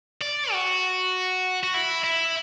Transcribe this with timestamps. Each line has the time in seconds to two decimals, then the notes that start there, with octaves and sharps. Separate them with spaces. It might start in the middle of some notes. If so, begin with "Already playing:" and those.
0.22 D5
0.52 F#4
1.63 F#4
1.74 E4
2.04 E4